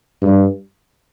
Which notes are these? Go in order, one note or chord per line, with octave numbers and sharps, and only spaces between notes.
G2